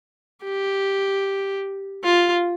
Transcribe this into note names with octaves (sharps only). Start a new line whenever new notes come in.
G4
F4